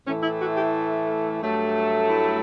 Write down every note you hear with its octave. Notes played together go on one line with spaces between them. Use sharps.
A2 E3 A3 C#4
E4
F#4
G4
G2 F#3 A3
E4